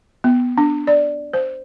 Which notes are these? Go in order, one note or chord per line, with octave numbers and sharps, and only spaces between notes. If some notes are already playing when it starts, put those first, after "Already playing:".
B3
D4
D5
C5